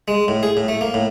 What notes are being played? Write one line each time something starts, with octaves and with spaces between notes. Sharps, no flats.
G#3
A2
G#4
A2
A3
A#3
A2